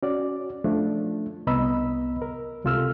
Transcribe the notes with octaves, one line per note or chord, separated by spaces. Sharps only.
C#4 F#4 D5
F3 A3 D4
C2 B3 D#5 A#5 B5 E6
A#4
C#2 C3 F4 A4 E6 F6